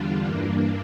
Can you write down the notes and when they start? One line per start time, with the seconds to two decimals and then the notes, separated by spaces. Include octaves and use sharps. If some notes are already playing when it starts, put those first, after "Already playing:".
Already playing: E2 D3 G3 D4 F4
0.24 G2 E3 A#3 D4